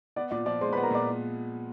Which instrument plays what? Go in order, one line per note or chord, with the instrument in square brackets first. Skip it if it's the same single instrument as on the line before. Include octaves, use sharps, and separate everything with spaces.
[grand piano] B3 [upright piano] D5 D6
[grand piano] A#2 [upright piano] D5 D6
[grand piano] F3 [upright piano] D5 D6
[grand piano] G#3 [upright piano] C5 C6
[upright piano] B4 B5
[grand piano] B3
[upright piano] A#4 A#5
[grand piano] A#2 [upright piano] D5 D6